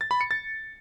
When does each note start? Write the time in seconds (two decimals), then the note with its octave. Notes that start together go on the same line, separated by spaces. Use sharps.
0.01 A6
0.11 B5
0.21 C#7
0.31 A6